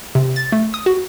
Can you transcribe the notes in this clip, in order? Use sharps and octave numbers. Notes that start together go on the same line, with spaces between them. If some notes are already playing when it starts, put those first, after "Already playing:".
C3
A6
A3
D#6
F#4